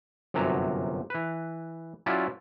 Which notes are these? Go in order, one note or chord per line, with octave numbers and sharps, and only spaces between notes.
G1 F#2 C3 F#3 A#5
E3 B4
F#3 C#4 E4 F4 D5 E5